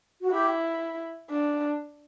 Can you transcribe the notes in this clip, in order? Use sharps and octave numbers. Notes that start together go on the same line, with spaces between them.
F#4
E4 G4
D4